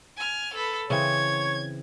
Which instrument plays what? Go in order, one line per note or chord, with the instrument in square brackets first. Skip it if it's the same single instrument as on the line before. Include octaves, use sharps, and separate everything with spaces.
[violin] G#5 F6
A4 B4
[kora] C#3 E3 C4 [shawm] C#5 [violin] G#6